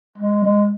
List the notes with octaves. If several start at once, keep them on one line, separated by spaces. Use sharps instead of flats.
G#3
G#3